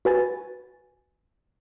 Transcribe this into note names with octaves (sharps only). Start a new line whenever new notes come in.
F#4 B4 G#5 A6